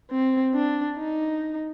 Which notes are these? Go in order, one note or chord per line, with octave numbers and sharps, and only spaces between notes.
C4
D4
D#4